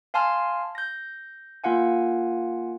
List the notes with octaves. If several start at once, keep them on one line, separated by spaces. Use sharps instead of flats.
F5 G#5 A5 C6 F6
G6 A#6
A#3 F4 F5 F#5 G#5